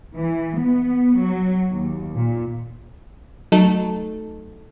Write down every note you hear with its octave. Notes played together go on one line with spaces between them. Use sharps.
E3
B3
F#3
D#2
A#2
F#3 A3 D#4 A4